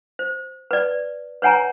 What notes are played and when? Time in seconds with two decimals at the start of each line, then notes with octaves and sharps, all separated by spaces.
0.19 C5
0.71 B4 D5
1.42 B4 C#5 F#5 G#5 A#5